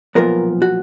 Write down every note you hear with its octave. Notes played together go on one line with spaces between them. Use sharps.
B1 A#2 F3 B3 A#4
F#4